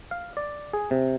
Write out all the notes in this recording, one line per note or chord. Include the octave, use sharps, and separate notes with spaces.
F5
D5
G#4
C3